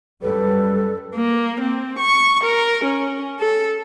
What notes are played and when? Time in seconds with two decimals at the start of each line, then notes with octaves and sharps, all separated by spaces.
0.22 F#2 G3 A4 B4
1.15 A#3
1.60 C4
1.98 C#6
2.44 A#4
2.84 C#4
3.39 A4